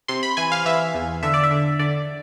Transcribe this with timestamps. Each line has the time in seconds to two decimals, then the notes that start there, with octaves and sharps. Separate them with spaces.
0.08 C3 C6
0.23 B5
0.37 E3 G#5
0.52 F5
0.65 E3 E5
0.94 E2
1.23 D3 E5
1.34 D5
1.44 E5
1.51 D3
1.79 D3 D5